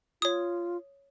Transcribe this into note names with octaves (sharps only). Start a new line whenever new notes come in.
F4 C#5 D#6